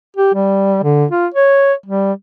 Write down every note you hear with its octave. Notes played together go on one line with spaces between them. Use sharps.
G4
G3
D3
F4
C#5
G3